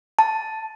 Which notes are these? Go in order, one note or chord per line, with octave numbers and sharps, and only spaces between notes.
A5